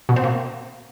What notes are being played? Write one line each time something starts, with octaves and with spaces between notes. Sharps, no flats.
B2
C4
A#3